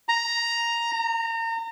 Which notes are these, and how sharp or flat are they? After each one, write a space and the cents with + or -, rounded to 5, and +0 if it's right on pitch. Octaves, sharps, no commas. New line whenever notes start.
A#5 +5
A#5 -35